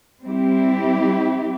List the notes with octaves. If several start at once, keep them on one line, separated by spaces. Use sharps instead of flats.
G3 C4 E4 G4